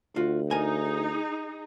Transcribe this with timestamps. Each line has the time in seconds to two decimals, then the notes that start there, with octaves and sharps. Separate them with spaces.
0.16 D2 F4 F#4
0.51 D#4 G#4 A#4 G#5